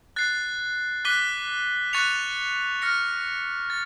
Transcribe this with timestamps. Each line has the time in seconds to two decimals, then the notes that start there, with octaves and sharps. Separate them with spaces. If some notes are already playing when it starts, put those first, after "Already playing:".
0.16 F#6 A6 C7
1.05 D6 F#6 B6 D#7 G7
1.93 C#6 F#6 A6 C#7 F7
2.82 F6 A#6 C#7
3.70 A6